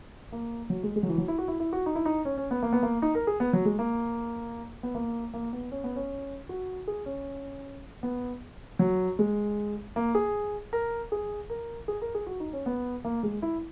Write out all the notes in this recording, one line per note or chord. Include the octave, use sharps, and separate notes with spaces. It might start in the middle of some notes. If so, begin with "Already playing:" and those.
A#3
F#3
G#3
G#3
F#3
E3
F#3
E4
F#4
E4
E4
F#4
D#4
E4
D#4
C#4
C#4
B3
A#3
B3
A#3
D#4
A#4
G#4
B3
F#3
G#3
A#3
B3
A#3
A#3
B3
C#4
B3
C#4
F#4
G#4
C#4
B3
F#3
G#3
A#3
G#4
A#4
G#4
A#4
G#4
A#4
G#4
F#4
D#4
C#4
B3
A#3
G#3
E4